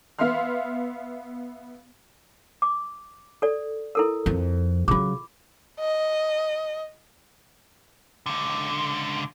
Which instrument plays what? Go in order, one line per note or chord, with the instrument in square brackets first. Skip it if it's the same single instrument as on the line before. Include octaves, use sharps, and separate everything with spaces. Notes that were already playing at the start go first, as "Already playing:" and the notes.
[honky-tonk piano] B3 E5 F5 C6 F6
[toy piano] D6
A4 D5
E4 A4 A#4
[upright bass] F2
[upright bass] C#3 F#3 [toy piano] F4 D6
[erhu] D#5
[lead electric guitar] C#2 D3